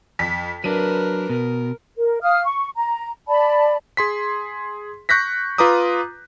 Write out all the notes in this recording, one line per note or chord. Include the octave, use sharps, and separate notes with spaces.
F2 B6
F#3 D4 A#4 B4 D#7
B2 A#4
A#4
F5 D#6 F6
C#6
A#5
D5 A5 B5
G#4 C6 B6
C#6 F#6 G6 A#6 B6
F4 B4 A#5 D6 D#6